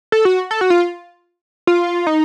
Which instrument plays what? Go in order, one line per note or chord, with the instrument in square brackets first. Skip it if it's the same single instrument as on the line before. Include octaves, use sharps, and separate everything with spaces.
[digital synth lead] A4
F#4
A4
F#4
F4
F4
D#4